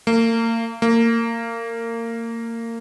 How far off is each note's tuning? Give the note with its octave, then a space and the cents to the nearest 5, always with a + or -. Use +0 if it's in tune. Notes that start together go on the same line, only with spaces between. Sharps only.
A#3 -35
A#3 -25